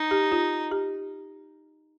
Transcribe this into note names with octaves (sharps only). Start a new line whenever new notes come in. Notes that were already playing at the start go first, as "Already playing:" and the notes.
Already playing: D#4
G4
F4
G4